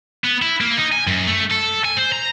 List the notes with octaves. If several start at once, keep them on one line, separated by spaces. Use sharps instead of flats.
B3
E4
A#3
D#4
G#5
F#2
A3
A4
G#5
C5
A#5